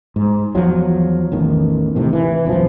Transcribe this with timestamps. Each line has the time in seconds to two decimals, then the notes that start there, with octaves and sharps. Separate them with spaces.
0.16 G#2
0.55 E2 F3 F#3
1.32 A1 E2 D#3
1.95 E2 A2 C3 D#3
2.13 E3
2.45 D#1 B1 F#2 F3